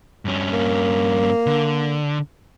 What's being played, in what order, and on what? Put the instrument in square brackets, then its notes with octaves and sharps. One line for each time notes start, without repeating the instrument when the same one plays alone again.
[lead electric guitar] G2 C#4
[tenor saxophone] A#3
[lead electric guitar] D3